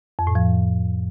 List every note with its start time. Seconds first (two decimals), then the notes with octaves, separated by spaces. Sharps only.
0.19 F2
0.27 A2
0.35 F3